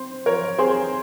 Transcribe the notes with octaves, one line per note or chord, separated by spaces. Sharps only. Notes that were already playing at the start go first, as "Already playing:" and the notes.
Already playing: C4 C5
F3 A#4 C#5
C4 G#4 C5